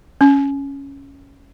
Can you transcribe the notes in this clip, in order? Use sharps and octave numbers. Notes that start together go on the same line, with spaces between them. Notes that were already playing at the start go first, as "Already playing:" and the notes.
C#4